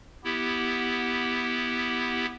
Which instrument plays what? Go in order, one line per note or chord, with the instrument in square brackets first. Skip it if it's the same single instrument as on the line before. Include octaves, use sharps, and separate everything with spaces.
[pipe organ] B3 E4 G4